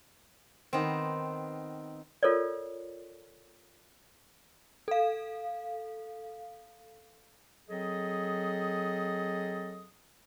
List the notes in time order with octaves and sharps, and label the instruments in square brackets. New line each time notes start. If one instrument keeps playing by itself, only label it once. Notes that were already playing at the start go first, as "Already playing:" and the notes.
[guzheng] D#3 B3 C4
[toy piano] F4 A4 A#4 C#5 D5
[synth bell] A4 F5
[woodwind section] F#3 C4 G#4 A4 D#5 D#6